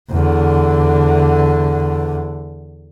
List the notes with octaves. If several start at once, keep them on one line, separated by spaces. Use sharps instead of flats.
E2 D3